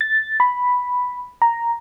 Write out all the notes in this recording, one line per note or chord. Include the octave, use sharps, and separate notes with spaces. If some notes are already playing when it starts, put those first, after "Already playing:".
A6
B5
A#5